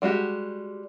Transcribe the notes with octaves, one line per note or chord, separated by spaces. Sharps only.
G3 G#3 F#4 G4